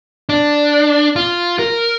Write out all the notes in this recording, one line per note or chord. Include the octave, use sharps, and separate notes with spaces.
D4
F4
A#4